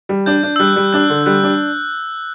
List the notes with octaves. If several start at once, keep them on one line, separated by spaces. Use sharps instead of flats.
G3
D4 G6
D4
E6
G3 F#6
G3
D4 F#6
D3
G3 F#6
D4